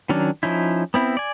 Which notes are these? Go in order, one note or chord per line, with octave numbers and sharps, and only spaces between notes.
D#3 F#3 C#4 D4
F3 C#4 D#4 E4
B3 C4 E4
D5 G#5